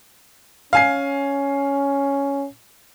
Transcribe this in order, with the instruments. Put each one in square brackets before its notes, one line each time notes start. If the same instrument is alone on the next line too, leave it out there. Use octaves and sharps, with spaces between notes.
[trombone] C#4 [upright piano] F5 G#5 C7